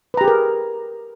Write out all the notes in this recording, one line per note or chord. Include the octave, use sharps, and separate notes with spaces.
G4 G#4 A#4 B4 A#5